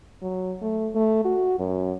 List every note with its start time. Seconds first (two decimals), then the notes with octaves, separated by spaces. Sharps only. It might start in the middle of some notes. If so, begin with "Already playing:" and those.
0.22 F#3
0.62 A3
0.95 A3
1.25 F#4
1.59 F#2